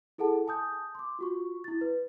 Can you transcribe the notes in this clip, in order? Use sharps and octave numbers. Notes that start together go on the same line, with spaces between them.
E4 G#4 A4 F#5 A5
G#5 A5 D#6 G6
C6 D6
F4 F#4 C#6
E4 A6
B4